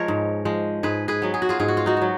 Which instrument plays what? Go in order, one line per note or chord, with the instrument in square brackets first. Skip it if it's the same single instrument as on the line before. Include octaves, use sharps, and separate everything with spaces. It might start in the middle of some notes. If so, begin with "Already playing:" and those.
Already playing: [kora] F3 G#3 A#4 C#5
G#2
F3 G#3
G#2 G#4 B4
G#4 B4
F#3 B3
G#4
F#4
F4 G#4
G#2 G#4
F#4
F4
D#4 F#4
F#3 B3